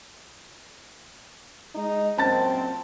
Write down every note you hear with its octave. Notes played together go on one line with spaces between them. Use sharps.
G#3 D#4
F#2 A#2 C4 A5 A6